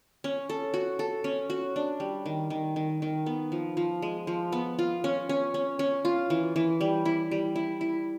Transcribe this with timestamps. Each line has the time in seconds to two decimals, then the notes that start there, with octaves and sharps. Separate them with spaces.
0.24 C#4
0.50 A4
0.74 F#4
0.99 A4
1.24 C#4
1.50 F#4
1.76 D4
2.00 G3
2.26 D#3
2.50 D#3
2.76 D#3
3.02 D#3
3.26 B3
3.52 F3
3.77 F3
4.02 G#3
4.27 F3
4.52 B3
4.79 F4
5.04 C#4
5.29 C#4
5.54 C#4
5.79 C#4
6.05 F4
6.30 E3
6.56 E3
6.81 G3
7.05 E4
7.31 G3
7.56 E4
7.81 E4